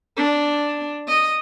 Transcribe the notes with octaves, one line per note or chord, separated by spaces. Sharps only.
D4
D#5